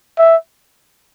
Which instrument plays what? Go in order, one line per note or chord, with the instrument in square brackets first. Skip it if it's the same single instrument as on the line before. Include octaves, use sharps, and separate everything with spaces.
[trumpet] E5